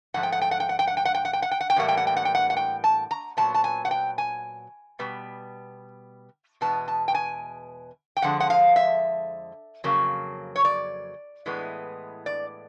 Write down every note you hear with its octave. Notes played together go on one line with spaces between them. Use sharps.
G#2 F3 A3 F#5
G5
F#5
G5
F#5
G5
F#5
G5
F#5
G5
F#5
G5
F#5
G5
F#5
G5
F#5
G5
A2 E3 G3 A#3 F#5
G5
F#5
G5
F#5
G5
F#5
F#5
G5
A5
A#5
A#2 F#3 B3 A5
A5
G#5
F#5
G5
G#5
B2 G3 B3
E2 B2 G#3 B3 A5
A5
G5
G#5
G5
F2 D3 F3 G#3 F#5
F#5
F5
E5
F2 C#3 F#3 A#3
C#5
D5
A2 E3 G#3 B3
D5